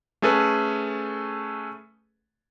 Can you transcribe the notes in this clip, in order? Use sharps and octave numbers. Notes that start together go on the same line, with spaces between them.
A3 C#4 G#4 A4 B4